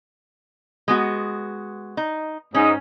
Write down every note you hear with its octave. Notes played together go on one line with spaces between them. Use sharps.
G#3 B3 F#4
D#4
G#2 C#4 D#4